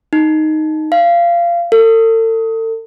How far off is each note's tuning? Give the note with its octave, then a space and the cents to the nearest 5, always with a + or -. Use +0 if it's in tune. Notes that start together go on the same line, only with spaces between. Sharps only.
D#4 +0
F5 -20
A4 +40